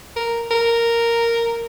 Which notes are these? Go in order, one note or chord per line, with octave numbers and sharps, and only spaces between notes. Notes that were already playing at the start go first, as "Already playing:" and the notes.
A#4
A#4